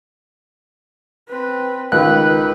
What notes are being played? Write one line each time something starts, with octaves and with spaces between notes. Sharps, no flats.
C4 B4
C#2 D#3 B4 F#6